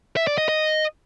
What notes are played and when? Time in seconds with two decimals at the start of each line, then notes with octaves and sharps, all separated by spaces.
0.17 E5
0.27 D5
0.38 D#5
0.49 D#5